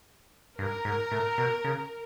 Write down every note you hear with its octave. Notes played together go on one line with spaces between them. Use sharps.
G2 A#4
G#2
A2
B2
C#3